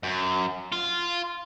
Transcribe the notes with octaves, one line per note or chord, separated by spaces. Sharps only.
F#2
F4